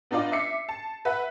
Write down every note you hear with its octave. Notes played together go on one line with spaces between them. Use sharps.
B3 D4 D#4 F4 D5
E5 D6 C7 C#7
A5
B4 E5 F#5